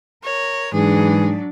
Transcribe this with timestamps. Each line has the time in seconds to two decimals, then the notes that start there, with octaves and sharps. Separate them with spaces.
0.24 A#4 C#5
0.74 G#2 E3 F#3 D4 G#4